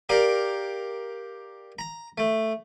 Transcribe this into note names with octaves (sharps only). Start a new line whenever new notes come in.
G4 A#4 D5 F5
A#5
A3